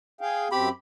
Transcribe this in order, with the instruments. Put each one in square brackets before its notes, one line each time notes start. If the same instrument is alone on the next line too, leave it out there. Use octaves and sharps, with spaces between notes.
[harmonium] G#4 F5 G5
[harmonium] F#2 C4 [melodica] G4 B5